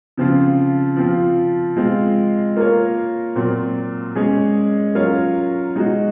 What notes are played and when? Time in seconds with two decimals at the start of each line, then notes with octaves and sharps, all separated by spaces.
0.17 C#3 F3 C4 F4
0.96 F3 C4 F4
1.77 G#3 C4 F4
2.56 A#3 F4 A#4 C#5
3.35 A#2 F#3 C4
4.15 G#3 C#4 G#4 C#5
4.95 F#3 C#4 F4 A#4 C#5
5.76 G#3 D#4 F#4